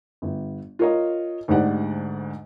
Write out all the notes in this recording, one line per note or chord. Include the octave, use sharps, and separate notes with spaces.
G1
F4 A#4 C#5 D#5
D2 G#2 D3 G4 D5 F#5